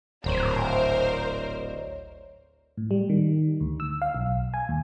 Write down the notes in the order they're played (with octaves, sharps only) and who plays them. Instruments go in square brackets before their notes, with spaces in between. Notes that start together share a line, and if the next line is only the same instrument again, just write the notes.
[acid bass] D1 [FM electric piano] G#1 D2 C#5 [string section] A#4 C5
[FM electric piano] A2
G3
D#3
D2
E6
F5
B1
G#5
D#2